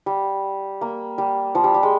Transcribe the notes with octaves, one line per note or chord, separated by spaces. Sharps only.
G3
A#3
G3
F3
G3
G3
G#3